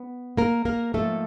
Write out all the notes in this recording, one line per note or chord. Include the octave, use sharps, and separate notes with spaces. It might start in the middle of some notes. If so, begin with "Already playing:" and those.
Already playing: B3
A#3 A#4
A#3 A#4
G#2 F3 A3 A#3 A4